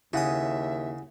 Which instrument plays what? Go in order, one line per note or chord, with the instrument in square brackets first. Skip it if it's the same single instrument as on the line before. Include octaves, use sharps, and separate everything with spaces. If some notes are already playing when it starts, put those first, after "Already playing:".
[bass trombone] D#2 [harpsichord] C#3 D#6 [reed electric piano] E4 F#5 G#5 [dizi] E5